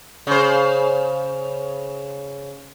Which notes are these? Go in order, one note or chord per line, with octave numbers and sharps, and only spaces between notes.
C#3 C5